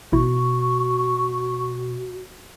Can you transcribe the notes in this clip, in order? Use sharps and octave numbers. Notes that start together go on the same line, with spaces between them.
A1 B2 E4 F#4 C#6